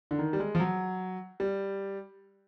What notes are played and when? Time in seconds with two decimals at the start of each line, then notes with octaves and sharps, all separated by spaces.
0.11 D3
0.19 D#3
0.33 G3
0.40 G#3
0.55 F3
0.60 F#3
1.40 G3